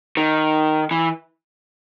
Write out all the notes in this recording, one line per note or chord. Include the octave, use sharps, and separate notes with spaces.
D#3
E3